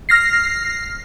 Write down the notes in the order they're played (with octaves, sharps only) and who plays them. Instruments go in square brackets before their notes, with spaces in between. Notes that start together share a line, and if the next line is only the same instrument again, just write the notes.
[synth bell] F6 A#6 C7